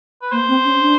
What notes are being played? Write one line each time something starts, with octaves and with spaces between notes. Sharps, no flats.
B4
A#3 C5
C4
C#4
D4